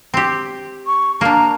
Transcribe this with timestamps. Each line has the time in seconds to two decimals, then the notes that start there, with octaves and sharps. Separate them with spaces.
0.14 C4 G4
0.87 C#6
1.21 A#3 D4 A#5